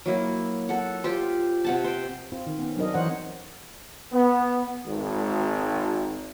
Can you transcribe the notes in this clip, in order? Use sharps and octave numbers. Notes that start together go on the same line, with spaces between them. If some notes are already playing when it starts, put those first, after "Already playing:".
F#3 A#3 E4
A4 F#5
F4 G4 C5
C3 F#5 A5
C5 G5
C4 F4
D#3
B3 C#4
F#3 C4 D4 D#4 A#4 D#5
E3 D#4 C5 C#5 F#5
B3
G#1